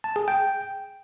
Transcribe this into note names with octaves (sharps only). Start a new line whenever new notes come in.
A5
G#4
G5